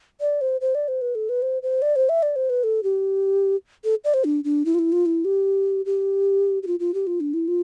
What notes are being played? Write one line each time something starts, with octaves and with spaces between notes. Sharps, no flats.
D5
C5
C5
D5
C5
B4
A4
B4
C5
C5
D5
C5
E5
D5
C5
B4
A4
G4
A4
D5
C5
D4
D4
E4
F4
E4
F4
E4
G4
G4
G4
F4
F4
G4
F4
D4
E4
F4